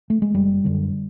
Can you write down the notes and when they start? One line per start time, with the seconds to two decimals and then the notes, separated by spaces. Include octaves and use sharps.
0.10 A3
0.22 G#3
0.34 F#1 G3
0.64 F#2 D3